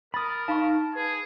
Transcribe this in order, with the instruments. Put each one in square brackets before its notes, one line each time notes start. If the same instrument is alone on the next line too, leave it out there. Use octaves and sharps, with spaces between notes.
[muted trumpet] A#4 [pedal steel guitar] B5 D#6 [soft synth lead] A6
[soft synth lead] D#4 [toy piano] F5 B5 C#6 [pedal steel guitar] A5
[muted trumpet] G#4 [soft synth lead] B4